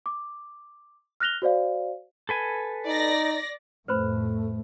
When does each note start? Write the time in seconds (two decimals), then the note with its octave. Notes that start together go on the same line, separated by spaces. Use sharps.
0.06 D6
1.20 F6 F#6 A#6 F7 G7
1.42 F#4 C5 D5 F5
2.29 A4 B4 G#5
2.86 D#4 D5 A#6
3.88 F2 A2 A3 B4 C5 B5